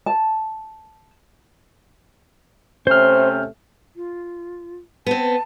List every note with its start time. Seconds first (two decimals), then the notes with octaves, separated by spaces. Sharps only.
0.06 A5
2.87 C3 A3 C#4 C5 F6 G6
3.96 F4
5.06 B3 C4 A5